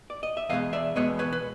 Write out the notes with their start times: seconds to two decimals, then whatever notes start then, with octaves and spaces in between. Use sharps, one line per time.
0.10 D5
0.23 D#5
0.37 E5
0.49 E2 B2 G#3 B3 D#5 F5
0.73 D5 E5
0.96 E2 B2 G#3 B3 C#5 D#5
1.19 B4 C#5
1.33 B4